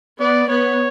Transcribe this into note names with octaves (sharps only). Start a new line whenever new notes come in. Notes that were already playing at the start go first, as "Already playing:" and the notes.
B3 D5
B3 C#5